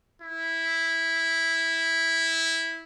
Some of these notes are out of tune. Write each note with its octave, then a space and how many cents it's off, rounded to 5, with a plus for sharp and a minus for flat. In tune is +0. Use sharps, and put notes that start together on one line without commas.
E4 -5